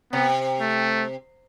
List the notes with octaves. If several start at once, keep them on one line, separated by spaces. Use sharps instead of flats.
C3 B3
A3